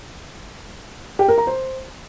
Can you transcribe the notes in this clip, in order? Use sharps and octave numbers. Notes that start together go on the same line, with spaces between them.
G4
A#4
A#5
C5